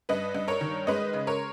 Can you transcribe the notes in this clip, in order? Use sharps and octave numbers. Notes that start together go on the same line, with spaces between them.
G2 B4 D#5
G2
A#4 C#5
D#3
G#3 B4 D#5
C#3
A#4 C#5